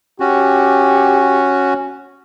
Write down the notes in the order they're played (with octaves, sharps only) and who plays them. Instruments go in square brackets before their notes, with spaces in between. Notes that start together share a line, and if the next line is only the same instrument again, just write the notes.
[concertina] C#4 F#4 [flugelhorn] G4